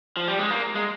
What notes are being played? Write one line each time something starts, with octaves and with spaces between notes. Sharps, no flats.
F3
G3
G#3
A#3
G#3